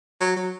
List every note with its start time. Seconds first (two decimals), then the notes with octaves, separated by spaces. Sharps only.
0.20 F#3
0.37 F#3